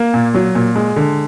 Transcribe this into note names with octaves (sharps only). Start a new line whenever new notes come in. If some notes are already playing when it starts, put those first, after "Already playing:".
Already playing: A#3
A#2
F#3
A#2
G#3
D3